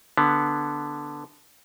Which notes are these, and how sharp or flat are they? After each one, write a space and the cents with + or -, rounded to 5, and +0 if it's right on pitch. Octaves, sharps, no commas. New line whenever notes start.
D3 +0 B3 +0